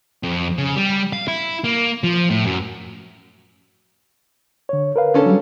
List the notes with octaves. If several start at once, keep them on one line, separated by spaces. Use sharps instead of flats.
F2
C#3
G3
F5
E4
A#3
F3
A2
F#2
D3 C#5
A#4 B4 F5
D3 C#4 A4
F#3 G3